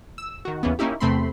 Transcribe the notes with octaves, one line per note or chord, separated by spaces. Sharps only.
E6
D#3 F#4
D#2 C#3 E3 B3
A#3 C#4 D#4 E4 G4
E2 C3 A3 C4 B5 C6